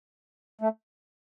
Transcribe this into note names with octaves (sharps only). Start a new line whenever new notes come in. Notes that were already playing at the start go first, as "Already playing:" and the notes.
A3